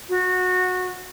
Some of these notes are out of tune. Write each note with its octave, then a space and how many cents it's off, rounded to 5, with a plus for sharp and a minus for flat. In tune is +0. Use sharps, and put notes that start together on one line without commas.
F#4 -15